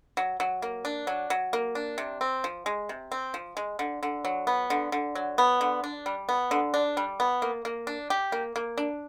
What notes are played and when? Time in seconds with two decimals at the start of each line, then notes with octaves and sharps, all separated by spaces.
0.17 F#3
0.40 F#3
0.62 A#3
0.85 D4
1.07 F#3
1.30 F#3
1.53 A#3
1.75 D4
1.98 C3
2.21 C4
2.44 F3
2.66 G#3
2.89 C3
3.12 C4
3.34 F3
3.57 G#3
3.79 D3
4.03 D3
4.25 F#3
4.47 B3
4.70 D3
4.92 D3
5.15 F#3
5.38 B3
5.61 D3
5.84 D4
6.06 G3
6.29 B3
6.51 D3
6.74 D4
6.97 G3
7.20 B3
7.42 A#3
7.65 A#3
7.87 D4
8.10 G4
8.32 A#3
8.56 A#3
8.78 D4